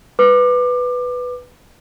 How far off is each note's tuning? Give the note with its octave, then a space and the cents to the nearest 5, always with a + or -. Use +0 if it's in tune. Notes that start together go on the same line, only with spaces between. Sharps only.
B4 +0 D6 +25